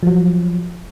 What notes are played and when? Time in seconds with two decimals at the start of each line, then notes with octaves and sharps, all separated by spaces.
0.03 F3 F#3